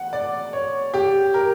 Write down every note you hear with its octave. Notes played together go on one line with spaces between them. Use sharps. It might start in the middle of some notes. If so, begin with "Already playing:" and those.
Already playing: F#5
D5
C#5
G4
A#4